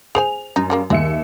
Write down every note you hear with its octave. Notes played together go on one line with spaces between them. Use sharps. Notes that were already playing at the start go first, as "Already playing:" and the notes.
G#4 C5 G#5 F7
F#2 D#4
C#3 G3 A#3
D#2 G#3 E5 C#7